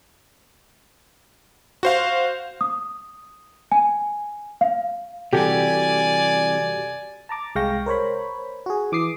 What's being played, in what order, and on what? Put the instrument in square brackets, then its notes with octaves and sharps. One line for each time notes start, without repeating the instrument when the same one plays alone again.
[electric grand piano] F#4 C5 F5
[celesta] D#6
G#5
F5
[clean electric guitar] C3 E3 G3 [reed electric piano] F#4 G4 A4 [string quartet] D5 G#5
[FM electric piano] A5 A#5 D6 A6
C2 G#3 F5 G5 C#6 A#6
A#4 C5 C#5 B5
F#4 G#4
E3 D6 D#6 C7